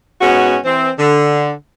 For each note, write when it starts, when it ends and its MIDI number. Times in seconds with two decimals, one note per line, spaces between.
0.21 0.57 44
0.21 0.57 59
0.21 0.57 61
0.21 0.57 66
0.65 0.91 52
0.65 0.91 60
0.99 1.51 50